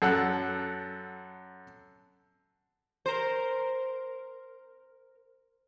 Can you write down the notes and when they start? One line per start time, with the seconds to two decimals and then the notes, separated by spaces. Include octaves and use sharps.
0.02 F#2 A4 F#5
3.06 A#4 C5